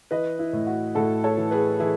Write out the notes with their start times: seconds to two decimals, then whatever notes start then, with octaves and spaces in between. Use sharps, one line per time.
0.11 E3 B4 D#5
0.39 E4
0.53 A2
0.67 F#4
0.95 A2 F#4 A4
1.24 A4 C#5
1.37 E3
1.51 G#4 B4
1.80 E3 E4 G#4